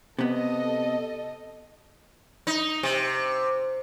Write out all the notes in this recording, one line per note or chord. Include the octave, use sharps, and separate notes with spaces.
C3 B3 A4 D#5
D#4
C3